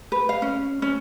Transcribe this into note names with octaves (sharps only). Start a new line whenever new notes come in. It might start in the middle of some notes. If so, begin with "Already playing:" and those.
B4
F5
C#4
C#4